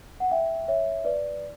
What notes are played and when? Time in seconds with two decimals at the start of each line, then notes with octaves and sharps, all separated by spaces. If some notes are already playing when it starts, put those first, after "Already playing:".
0.20 F#5
0.31 E5 G5
0.68 C#5 E5
1.05 B4 D5